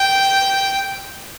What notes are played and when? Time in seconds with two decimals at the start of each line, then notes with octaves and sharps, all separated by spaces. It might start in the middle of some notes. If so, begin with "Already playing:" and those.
Already playing: G5